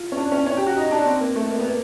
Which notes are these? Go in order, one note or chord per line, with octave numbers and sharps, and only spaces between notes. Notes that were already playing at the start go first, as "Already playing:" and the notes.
Already playing: F4
C#4
D4
C#4
C#4
G4
F#4
D#4
D4
C4
A#3
A3
A#3
B3
A#3